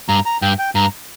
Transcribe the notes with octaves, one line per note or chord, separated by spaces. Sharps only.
G2 A#5
A#5
G2 G5
G5
G2 A#5